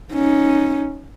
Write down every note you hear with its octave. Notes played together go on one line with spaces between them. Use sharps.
C#4 D#4